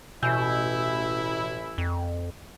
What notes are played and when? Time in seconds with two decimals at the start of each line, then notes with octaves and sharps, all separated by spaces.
0.23 A1 B2 E4 G#5 E6 G6
1.78 F2